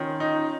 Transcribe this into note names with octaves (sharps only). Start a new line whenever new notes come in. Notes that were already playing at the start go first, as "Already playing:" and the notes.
Already playing: D#3 C#4 F4
D#4